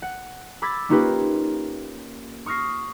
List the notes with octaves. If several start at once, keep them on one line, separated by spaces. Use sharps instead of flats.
F#5
B5 D6 E6 G#6 A6 B6
A#3 C#4 D#4 F4 G4 B4
C#6 D#6 F6 A#6 C7